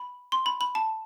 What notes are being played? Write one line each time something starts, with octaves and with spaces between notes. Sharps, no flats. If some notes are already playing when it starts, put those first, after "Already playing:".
Already playing: B5
C6
B5
B5
A5